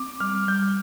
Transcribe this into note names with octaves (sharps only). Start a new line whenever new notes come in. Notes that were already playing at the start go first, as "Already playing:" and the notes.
Already playing: C4 D6
G3 F6
G3 G6